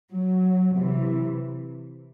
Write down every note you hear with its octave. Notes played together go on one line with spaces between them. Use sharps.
F#3
C3 E3